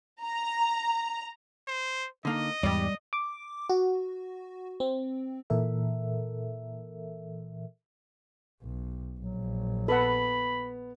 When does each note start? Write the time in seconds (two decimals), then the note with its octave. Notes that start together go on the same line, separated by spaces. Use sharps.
0.22 A#5
1.67 C5
2.25 D3 A#3 D#4 D#5
2.63 E2 G#2 G3 G4 D5
3.13 D6
3.70 F#4
4.80 C4
5.50 A#2 E3 A4 A#4 E5
8.62 B1
9.18 A#1 F#3
9.88 B3 A4 B4 F#5 B5